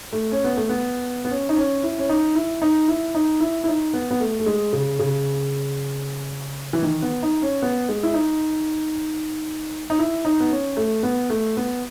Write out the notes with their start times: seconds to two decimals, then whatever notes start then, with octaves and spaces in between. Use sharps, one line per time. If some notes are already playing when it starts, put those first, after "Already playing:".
0.12 A3
0.32 C#4
0.44 B3
0.57 A3
0.69 B3
1.25 B3
1.30 C#4
1.49 D#4
1.56 C#4
1.83 E4
1.98 C#4
2.09 D#4
2.35 E4
2.62 D#4
2.88 E4
3.15 D#4
3.40 E4
3.64 E4
3.68 D#4
3.94 B3
4.11 B3
4.20 A3
4.39 A3
4.46 G#3
4.73 C#3
4.99 C#3
6.73 E3
6.82 D#3
7.02 B3
7.23 D#4
7.42 C#4
7.62 B3
7.89 G#3
8.03 E4
8.14 D#4
9.90 D#4
9.99 E4
10.25 D#4
10.40 B3
10.51 C#4
10.77 A3
11.03 B3
11.30 A3
11.57 B3